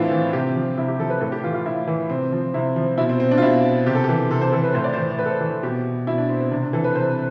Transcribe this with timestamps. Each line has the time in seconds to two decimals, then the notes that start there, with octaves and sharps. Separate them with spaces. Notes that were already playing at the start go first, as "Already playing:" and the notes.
Already playing: A2 E3 C4 D4 E4 F4
0.11 E3
0.33 C3 G4
0.56 F3
0.78 C3 E4
0.88 G4
1.00 F3 A4
1.10 B4
1.21 A2 A4
1.32 G4
1.44 E3 F4
1.54 F4
1.66 A2 E4
1.87 E3
2.10 C3 C4
2.32 F3
2.54 C3 E4
2.76 F3
2.98 B2 E4
3.09 C4
3.20 C4
3.31 D4
3.38 F4
3.42 B2 E4
3.86 C3 G4
3.95 A4
4.04 G4
4.09 E3
4.30 C3 A4
4.41 C5
4.52 E3 A4
4.64 B4
4.75 A2 C5
4.84 D5
4.93 C5
4.97 E3
5.19 A2 B4
5.26 A4
5.33 B4
5.40 E3
5.63 B2 G4
6.07 B2 E4
6.18 D4
6.29 C4
6.40 C4
6.51 C3 D4
6.63 D4
6.73 E3 A4
6.84 B4
6.95 C3 C5